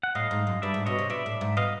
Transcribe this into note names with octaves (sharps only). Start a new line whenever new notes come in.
F#5
A2 D#5 F5
G#2
F#2
G2 D5 E5
G#2
B2 C#5 D#5
C3
B2 D5 E5
A2
G#2
B2 D#5 F5